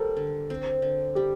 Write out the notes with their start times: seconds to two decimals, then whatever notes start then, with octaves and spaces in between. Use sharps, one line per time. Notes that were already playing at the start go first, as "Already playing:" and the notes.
Already playing: G3 C4 A4 A#4
0.17 D3
0.50 C4
0.82 D3
1.15 G3 G4